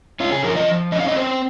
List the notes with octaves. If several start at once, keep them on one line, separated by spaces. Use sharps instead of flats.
C#4 F4
G#4
F3 A#4
D#5
F3
C#4 D#5
F5
D#5
C4 C5